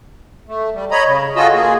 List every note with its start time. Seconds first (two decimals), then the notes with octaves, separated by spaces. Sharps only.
0.48 A3
0.74 G3
0.91 C#5 D#5 A#5 B5
1.06 C#3
1.36 F4 F#4 G#4 A4 D#5 E6
1.54 A#3 G#4